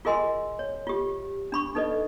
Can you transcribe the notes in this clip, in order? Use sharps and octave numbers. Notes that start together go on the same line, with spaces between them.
F4 G#4 A#4 D#5 G#5 C6
C#5
F4 G4
D4 B5 C#6
D#4 A4 B4 D5 D#5